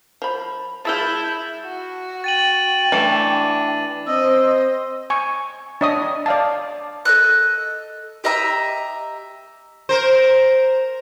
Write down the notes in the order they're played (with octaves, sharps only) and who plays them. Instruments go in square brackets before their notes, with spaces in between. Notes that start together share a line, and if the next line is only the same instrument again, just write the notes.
[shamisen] F3 B5
[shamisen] G#3 F4 [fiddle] E4 [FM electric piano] A5 E6 G6
[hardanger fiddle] F#4
[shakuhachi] G5 [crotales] A6 D#7 F#7
[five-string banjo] E3 A3 [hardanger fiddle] D4
[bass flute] C4 [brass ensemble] C5 [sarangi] D#5 [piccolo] E6
[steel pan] G#5 C#6
D4 C#5 D#5 E5 D#6
D5 F5 A5
[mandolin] A4 D#5 E6 F#6
G4 D#5 E5 A#5
[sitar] A#4 C5